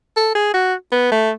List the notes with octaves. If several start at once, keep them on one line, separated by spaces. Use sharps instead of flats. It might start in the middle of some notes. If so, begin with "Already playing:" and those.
A4
G#4
F#4
B3
A3